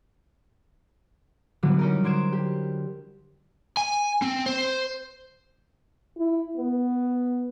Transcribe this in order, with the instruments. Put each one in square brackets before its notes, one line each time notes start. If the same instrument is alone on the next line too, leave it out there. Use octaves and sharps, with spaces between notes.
[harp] D3 E3 F#3 G3 B3
C#4 D#4 A#4
D3 C5 G#6 D7 E7
G4
[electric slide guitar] G#5
C4
C5
[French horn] E4
B3